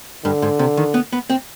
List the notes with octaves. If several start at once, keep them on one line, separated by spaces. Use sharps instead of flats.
G2 D3
G#2
C3
D#3
B3
B3
C4